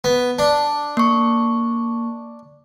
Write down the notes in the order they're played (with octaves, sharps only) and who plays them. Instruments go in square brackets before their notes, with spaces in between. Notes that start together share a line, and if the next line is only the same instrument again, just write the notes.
[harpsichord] B3
D4
[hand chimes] A#3 C#6